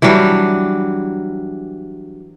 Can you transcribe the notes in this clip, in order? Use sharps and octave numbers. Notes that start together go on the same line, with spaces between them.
E3 F#3 G3 D4